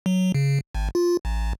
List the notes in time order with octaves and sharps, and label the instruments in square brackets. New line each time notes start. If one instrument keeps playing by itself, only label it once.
[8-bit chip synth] F#3
C#3
G#1
F4
A1